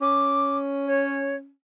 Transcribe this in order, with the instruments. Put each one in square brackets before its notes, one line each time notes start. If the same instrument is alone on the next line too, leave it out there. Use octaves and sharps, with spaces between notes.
[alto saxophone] C#4 [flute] D6
[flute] C#5